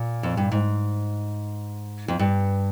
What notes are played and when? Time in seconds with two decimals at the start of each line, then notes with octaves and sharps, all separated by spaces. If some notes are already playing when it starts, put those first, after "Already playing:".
Already playing: A#2
0.23 F2
0.37 G2
0.52 G#2
2.08 F2
2.19 G2